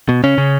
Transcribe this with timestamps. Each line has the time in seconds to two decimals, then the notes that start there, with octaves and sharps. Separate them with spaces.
0.09 B2
0.24 C#3 C#4
0.38 C#3